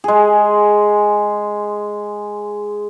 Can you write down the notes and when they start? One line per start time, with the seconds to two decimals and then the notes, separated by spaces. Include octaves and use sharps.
0.04 G#3 G#4